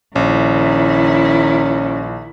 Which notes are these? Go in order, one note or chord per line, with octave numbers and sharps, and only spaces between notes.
A#1 D#3 C#4 E4